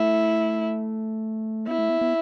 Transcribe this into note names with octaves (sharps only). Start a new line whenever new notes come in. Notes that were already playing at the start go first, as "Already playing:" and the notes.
Already playing: A3 E4
B3 E4
A3
B3
B3